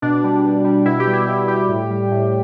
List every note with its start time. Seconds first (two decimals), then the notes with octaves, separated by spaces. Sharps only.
0.02 B2 D4
0.24 G3
0.44 B2
0.64 G3
0.85 B2 E4
1.00 G4
1.07 G3
1.13 E4
1.27 B2 E4
1.48 G3 G4
1.69 A2
1.90 G3
2.11 A2